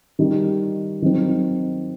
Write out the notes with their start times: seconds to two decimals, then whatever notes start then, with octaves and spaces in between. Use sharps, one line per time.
0.19 D#3 G3 D#4 G4
1.02 D#3 F#3 C4 D#4